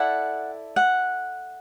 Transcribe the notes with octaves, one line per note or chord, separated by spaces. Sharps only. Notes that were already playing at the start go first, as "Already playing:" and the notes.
Already playing: E4 A4 D5 F#5
F#5